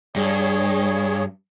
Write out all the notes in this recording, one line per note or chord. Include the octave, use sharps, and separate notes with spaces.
G2 G#4 C#5